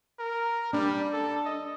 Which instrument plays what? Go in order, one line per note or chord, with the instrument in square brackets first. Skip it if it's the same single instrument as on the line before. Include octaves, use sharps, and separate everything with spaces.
[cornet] A#4
[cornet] G3 [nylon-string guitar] D4
[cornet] A4
D#5